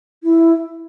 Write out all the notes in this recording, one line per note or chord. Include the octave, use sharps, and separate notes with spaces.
E4